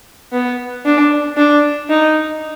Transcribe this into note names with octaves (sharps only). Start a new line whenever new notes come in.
B3
D4
D4
D#4